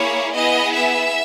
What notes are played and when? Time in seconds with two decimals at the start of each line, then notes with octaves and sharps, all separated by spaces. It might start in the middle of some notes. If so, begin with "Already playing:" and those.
Already playing: A#3 E4 G#4 C#5
0.33 B3 E4 G#4 D#5
0.74 E5